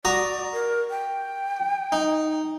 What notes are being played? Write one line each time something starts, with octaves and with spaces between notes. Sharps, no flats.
F#4 D5 A#5 D#6
A#4
G5
D#4